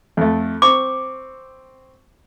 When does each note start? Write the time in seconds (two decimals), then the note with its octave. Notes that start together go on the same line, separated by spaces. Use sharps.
0.17 F2 A3
0.62 C4 C#6 D6